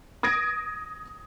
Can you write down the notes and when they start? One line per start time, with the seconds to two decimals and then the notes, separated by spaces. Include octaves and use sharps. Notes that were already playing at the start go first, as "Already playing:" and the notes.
0.23 D#6 G#6 A#6 D7